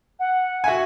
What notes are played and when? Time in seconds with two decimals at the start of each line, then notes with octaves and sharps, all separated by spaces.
0.19 F#5
0.64 F#4 E5 G#5